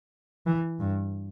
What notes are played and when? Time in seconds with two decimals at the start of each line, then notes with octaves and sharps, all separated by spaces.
0.46 E3
0.80 G2